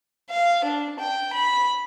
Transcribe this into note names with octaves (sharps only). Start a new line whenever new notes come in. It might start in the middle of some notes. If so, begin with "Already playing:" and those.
F5
D4
G5
B5